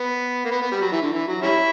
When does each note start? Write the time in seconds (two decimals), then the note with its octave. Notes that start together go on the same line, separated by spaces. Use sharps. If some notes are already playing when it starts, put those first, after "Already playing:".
Already playing: B3
0.45 A#3
0.51 B3
0.62 B3
0.72 G3
0.81 F#3
0.92 E3
1.02 D3
1.12 E3
1.27 F#3
1.42 G3 C#4 E4